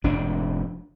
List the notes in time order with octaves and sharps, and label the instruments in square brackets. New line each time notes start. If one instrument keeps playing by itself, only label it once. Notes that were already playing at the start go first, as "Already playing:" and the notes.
[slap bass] F1 F2 G#2 D4